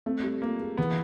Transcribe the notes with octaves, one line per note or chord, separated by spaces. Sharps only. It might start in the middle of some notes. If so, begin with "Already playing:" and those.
A3 C4
G3
A#3 F4
G#4
E3 B3